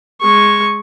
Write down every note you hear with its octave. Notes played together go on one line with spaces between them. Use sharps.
G#3 C#6